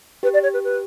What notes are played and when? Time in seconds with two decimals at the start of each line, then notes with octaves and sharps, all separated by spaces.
0.23 G4 B4
0.34 D5
0.43 C#5
0.54 B4
0.64 B4